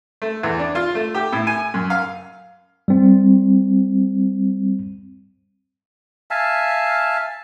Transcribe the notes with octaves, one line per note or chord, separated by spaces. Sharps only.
A3
E2
D4
F4
A3
G4
A2
G#5
F#2
F5
G3 C4
E5 F5 G#5 A5